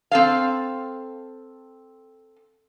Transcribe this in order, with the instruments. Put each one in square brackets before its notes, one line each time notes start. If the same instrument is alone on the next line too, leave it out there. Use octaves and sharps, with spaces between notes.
[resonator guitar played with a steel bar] C4 A4 F5